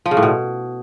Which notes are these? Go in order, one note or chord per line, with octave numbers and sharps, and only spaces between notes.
F3
C#3
A2
B2